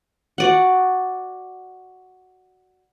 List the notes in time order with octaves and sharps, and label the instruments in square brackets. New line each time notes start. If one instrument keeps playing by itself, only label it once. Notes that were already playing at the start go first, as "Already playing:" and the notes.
[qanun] F#4 D5 F#5